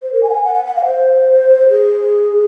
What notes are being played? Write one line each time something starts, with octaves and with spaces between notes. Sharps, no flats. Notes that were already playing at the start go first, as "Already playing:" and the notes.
C5
A#4
G#5
F#5
G#5
F#5
F#5
F#5
F5
C5
G#4